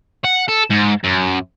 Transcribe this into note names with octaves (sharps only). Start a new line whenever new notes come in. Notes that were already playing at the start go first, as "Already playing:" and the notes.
F#5
A4
G#2
F#2